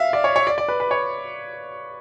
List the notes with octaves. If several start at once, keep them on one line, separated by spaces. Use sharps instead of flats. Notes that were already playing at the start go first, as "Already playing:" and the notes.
Already playing: E5 F5
D5
C#5
C#5
D5
D5
B4
B4
C#5